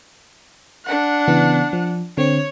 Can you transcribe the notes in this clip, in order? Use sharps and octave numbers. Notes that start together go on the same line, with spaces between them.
D4 F#5
C#3 E3 B3
F3
D3 C4 C#5